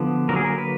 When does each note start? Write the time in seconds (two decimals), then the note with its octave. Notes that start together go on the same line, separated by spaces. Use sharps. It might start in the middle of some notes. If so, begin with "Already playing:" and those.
Already playing: D3 F3 B3
0.29 D3 F#3 A#3 A#4
0.36 G#4
0.45 A#4
0.58 B4